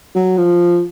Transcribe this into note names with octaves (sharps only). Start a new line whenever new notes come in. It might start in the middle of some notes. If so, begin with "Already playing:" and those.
F#3
F3